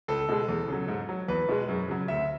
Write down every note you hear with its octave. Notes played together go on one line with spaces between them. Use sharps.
C#2 A4
B2 G#3
E2
C#3 F#3
G#2
F#3
E2 B4
B2 G#3
F#2
C#3 F#3
D2 E5